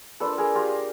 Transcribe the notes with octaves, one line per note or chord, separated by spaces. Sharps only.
A#3 D4 F4 A4 B4
G#4 A#4
F4 G4